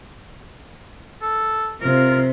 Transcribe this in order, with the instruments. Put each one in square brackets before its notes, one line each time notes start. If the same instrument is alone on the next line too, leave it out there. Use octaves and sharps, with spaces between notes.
[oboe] A4
[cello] C3 [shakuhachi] F4 [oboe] A#4